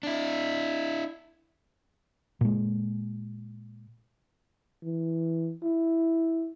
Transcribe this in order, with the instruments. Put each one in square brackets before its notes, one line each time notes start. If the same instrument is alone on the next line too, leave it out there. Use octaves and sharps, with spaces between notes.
[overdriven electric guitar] D4 E4
[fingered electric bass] A#2 G#3
[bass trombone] E3
E4